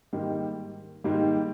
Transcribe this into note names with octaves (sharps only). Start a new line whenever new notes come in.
G#2 D#3 G3 A#3
G#2 D#3 G3 A#3